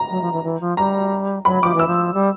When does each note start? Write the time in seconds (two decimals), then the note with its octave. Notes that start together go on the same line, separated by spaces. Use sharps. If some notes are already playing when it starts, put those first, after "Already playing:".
Already playing: A#5
0.10 F#3
0.21 F3
0.32 E3
0.43 E3
0.60 F3
0.77 G3 A#5
1.45 F#3 B5
1.62 F3 D6
1.74 E3
1.79 E6
1.87 F3
2.13 G3